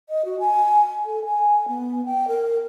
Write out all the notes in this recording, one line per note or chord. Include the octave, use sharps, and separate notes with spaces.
D#5
F#4
G#5
A4
G#5
B3
G5
A#4